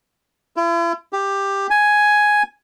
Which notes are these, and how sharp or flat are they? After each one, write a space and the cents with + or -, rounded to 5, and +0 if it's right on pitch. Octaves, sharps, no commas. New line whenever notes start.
E4 +45
G4 +10
G#5 +5